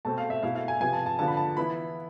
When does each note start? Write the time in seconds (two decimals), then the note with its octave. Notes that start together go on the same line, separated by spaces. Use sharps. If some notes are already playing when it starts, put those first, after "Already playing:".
0.05 B2 A3 C4 A5
0.18 F5
0.30 E5
0.43 B2 A3 E4 F5
0.55 F5
0.68 G#5
0.80 C3 F3 B3 G#5
0.93 A5
1.06 A5
1.19 D3 F3 B3 F4 A5
1.28 B5
1.37 A5
1.57 E3 B3 E4 B5